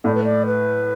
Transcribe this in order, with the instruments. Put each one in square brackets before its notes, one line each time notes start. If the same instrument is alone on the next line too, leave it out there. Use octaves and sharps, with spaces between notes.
[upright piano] A2 A3 [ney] D5
[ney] B4
D5
B4